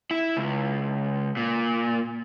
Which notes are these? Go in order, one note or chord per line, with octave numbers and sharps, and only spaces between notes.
E4
C#2
A#2